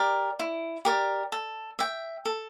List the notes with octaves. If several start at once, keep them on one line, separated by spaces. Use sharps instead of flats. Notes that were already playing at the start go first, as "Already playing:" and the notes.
Already playing: G4 A#4 D5
E4
G4 A#4 D5
A4
E5 G5
A4